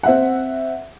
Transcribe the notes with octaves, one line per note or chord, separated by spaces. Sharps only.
C4 E5 F#5